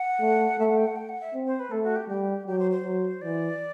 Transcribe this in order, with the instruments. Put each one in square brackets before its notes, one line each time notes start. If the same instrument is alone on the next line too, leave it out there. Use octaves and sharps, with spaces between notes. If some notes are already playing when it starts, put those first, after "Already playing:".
Already playing: [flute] F#5
[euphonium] A3
[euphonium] A3 [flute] E5
[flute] F#5
G5
F#5
G5
F#5
E5
[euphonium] C4
[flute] C5
B4
[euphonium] A3 [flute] A4
[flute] F#4
G4
[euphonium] G3 [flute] G4
[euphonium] F#3 [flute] G4
[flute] C5
C5
[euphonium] F#3
[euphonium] E3 [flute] D5